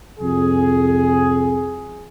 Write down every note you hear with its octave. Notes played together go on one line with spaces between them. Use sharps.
C2 F2 G#4